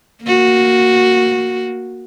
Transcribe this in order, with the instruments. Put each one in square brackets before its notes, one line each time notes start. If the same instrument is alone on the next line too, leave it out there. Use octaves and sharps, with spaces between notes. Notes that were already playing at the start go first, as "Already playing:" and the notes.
[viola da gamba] A#3 F#4